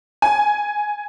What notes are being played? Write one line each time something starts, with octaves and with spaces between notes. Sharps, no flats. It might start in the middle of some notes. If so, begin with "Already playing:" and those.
G#5